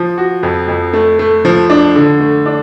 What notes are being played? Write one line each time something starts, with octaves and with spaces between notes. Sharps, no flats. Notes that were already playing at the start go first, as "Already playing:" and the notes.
Already playing: F3
F#4
F2
F2
A3
A3
F3
D4
D3
A3
D4